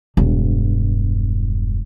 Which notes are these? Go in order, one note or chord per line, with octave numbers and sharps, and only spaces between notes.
E1 G2